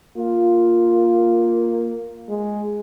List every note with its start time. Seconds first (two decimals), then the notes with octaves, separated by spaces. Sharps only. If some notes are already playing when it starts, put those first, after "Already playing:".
0.17 A#3 F4
2.28 G#3